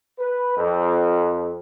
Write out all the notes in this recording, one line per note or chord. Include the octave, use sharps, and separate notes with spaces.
B4
F2